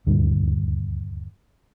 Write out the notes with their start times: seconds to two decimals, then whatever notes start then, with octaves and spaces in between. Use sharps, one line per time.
0.06 D#1 D2 G2